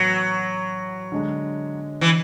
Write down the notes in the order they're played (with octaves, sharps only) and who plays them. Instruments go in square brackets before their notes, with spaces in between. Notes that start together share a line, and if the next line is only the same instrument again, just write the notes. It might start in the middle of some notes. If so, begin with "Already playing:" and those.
Already playing: [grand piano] A2 E3 B3 F#4 [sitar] F#3
[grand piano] D3 G#3 D4
[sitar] E3